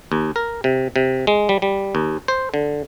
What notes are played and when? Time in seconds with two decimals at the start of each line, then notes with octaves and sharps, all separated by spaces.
0.12 D#2
0.36 A#4
0.64 C3
0.96 C3
1.27 G#3
1.49 G3
1.62 G3
1.95 D#2
2.28 C5
2.54 D3